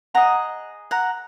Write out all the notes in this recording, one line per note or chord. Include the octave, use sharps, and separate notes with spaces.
G#4 D#5 F#5 A#5
F#5 A#5